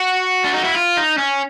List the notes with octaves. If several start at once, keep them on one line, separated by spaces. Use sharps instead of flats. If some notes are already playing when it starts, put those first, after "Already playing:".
Already playing: F#4
D4
D#4
E4
F4
D#4
C#4